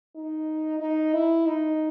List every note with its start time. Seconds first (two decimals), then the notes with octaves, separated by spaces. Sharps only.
0.16 D#4
0.80 D#4
1.13 E4
1.46 D#4